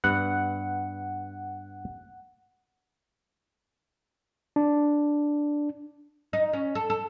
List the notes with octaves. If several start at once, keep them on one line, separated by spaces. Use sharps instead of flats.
G2 B3 F#5
D4
D#4
C#4
A4
A4